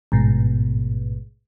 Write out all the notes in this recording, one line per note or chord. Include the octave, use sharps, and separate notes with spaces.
A1 G#2 B2